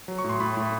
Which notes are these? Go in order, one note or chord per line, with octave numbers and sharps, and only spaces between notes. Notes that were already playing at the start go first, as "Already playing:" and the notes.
F#3
C#6
A2
C6
A2 B5
A2